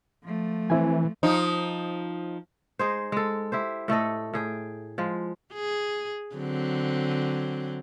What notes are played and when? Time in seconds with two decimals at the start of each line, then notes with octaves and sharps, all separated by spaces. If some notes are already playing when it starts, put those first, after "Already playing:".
0.24 F3 A3
0.70 E3 C4 E4 G#5
1.23 F3 D#4
2.79 G#3 D#4 G#4 C5
3.12 G#3 A4
3.52 E4 G4 C5
3.88 A2 A3 A4 D#5
4.34 A2 G#4 G5
4.98 F3 G#3
5.54 G#4
6.35 D3 F#3 C4